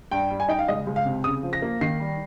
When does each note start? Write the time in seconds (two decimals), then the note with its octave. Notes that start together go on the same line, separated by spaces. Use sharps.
0.11 G2 G5
0.30 G3
0.40 G#5
0.48 D#4 G5
0.59 F5
0.68 C#2 D#5
0.87 C#2
0.96 F5
1.05 C3
1.24 C#3 D#6
1.43 F3
1.53 A#6
1.62 A#3
1.81 D#3 C7
2.00 G3